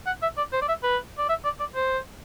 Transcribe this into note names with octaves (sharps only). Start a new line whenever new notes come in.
F#5
E5
D5
C5
D5
E5
B4
D5
E5
D5
D5
C5